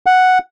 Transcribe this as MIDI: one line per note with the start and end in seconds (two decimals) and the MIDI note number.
0.06 0.39 78